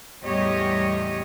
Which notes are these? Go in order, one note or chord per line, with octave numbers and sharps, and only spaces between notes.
E2 A2 G3 G4 C#5 D#5